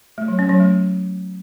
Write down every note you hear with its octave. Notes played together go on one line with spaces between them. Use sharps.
A3
F#3
C#4
F#3
A3